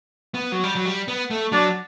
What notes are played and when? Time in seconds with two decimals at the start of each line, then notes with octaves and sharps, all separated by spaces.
0.34 B3
0.52 F#3
0.64 G3
0.75 F#3
0.86 G3
1.08 B3
1.30 A3
1.52 F#3 D4